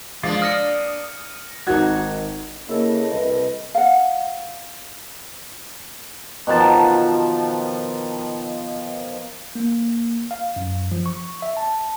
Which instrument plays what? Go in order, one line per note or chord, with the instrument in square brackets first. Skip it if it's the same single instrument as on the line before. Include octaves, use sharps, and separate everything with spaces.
[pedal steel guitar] F3 G#3 F4 [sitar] A#3 D4
[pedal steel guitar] D#6 [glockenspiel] F6 A#6 C#7
[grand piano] G#1 D#3 G#6 [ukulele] D#4 F#4
[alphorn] C#3 [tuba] A#3 [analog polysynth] E4 A4 [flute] D#5
[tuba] C2 [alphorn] B4
[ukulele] F5 F#5
[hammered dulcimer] B2 D#3 F3 A5
[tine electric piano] A#3
F5
F#2
F3
C#6
E5
A5